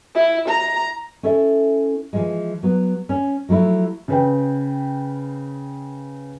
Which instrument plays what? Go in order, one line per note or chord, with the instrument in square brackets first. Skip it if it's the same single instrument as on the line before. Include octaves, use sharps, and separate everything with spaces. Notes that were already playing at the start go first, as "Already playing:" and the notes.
[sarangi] E4
A#5
[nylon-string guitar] C#4 E4 A4 E5
E3 F3 G#3
F#3 B3
C#4
F3 F#3 A3 E4
[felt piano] C#3 B4 G5